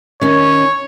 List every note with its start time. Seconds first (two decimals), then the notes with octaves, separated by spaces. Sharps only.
0.21 D#3 C#4 C#5